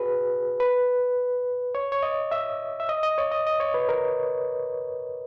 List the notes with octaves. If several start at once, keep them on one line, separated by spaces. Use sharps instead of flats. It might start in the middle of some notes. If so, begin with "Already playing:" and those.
Already playing: F#4 G#4 B4
B4
C#5
C#5
D#5
E5
E5
D#5
D#5
C#5
D#5
D#5
C#5
B4
A#4